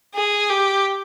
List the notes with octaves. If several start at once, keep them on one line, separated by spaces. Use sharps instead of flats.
G#4
G4